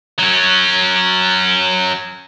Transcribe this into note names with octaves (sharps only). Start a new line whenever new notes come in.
F#3 C#4